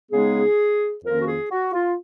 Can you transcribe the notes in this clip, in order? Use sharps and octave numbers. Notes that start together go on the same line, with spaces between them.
C#3 G#3 B3 D#4 G#4
F2 D#3 A#3 C#4 F4 A#4
F#4
G#4
F#4
F4